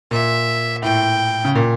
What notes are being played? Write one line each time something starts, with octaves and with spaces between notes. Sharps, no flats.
A#2 E5
A2 G5
C#3
A#2